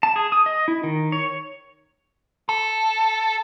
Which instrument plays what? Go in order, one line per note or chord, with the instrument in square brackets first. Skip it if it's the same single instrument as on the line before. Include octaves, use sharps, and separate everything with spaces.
[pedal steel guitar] A5
G#4
D#6
D#5
E4
D#3
C#5
[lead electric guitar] A4